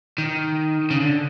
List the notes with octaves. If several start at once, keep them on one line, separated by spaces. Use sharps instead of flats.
D#3
C#3
D3